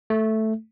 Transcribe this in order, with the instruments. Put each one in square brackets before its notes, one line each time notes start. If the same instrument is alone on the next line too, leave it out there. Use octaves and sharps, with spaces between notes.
[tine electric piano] A3